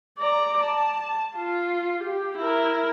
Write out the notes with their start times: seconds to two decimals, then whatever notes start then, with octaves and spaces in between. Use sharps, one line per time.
0.19 D5 A#5
0.64 A5
1.36 F4
2.04 G4
2.38 E4 A#4